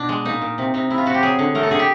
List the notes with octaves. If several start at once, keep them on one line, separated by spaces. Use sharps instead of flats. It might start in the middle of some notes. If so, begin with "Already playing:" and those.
Already playing: B2 D4
G#3
A#2 D#4
A#2
C3
C3 D#4
C3 E4
F4
C3 F#4
G4
F#3 G#4
D3
A3 A#4
A4
D3 G#4
G4